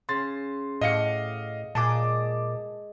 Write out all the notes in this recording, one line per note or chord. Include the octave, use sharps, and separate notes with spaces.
C#3 C6 A6
A2 G4 D#5 F5 F#5 C6 C#7
A#2 G#3 G#4 D#5 A5 D6